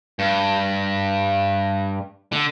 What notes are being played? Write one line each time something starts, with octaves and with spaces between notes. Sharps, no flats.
G2
D3